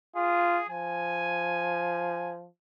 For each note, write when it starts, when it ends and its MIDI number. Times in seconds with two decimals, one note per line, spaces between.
0.16 0.60 65
0.16 0.65 68
0.69 2.48 53
0.69 2.32 80